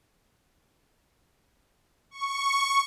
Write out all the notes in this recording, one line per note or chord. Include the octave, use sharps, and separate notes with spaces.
C#6